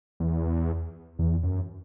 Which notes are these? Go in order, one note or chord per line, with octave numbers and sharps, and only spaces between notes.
E2
E2
F#2